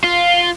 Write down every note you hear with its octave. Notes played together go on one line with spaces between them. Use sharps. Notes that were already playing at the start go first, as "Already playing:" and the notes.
F4